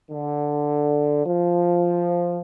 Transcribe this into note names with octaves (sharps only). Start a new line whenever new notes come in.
D3
F3